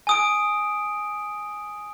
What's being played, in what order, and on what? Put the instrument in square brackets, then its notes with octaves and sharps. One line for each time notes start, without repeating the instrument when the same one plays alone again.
[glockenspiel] G#5 D#6 D7